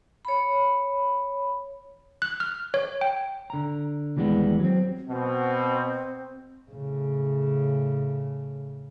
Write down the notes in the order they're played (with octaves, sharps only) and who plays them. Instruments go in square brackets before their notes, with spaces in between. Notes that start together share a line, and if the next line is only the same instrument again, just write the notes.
[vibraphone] C#5 B5
[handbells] F#6
F6
C#5
G5
[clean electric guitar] D3 A#5
D#2 E3 G3 G#3 B3
F#3 C4
[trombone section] B2 [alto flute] C4
[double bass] A2 C#3